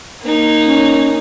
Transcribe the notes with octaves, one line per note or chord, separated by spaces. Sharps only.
A#3 D#4
C#4